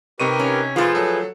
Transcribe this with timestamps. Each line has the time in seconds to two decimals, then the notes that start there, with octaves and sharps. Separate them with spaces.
0.20 C3 D#4 G4 A#4 B4 C#6 D#7
0.39 C#4
0.76 F3 A3 F4 G#4 B4
0.95 F#3 A4